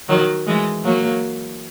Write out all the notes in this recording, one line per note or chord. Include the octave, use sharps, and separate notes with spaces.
D#3 F#3
E3 G#3
F#3 A#3